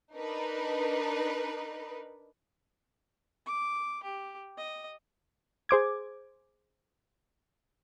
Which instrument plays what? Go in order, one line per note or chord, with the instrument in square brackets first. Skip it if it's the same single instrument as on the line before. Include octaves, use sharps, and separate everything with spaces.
[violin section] D4 D#4 A#4 B4
[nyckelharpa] D6
G4
D#5
[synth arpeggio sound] G#4 C5 D6 G#6